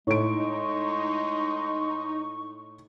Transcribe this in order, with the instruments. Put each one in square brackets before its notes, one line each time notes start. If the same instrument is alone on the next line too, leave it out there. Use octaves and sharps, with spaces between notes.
[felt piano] A2 D7 [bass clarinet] G#3 [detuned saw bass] D#4 [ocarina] C#6